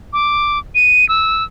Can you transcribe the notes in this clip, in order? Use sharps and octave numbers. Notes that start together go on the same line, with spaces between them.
D6
D#7
E6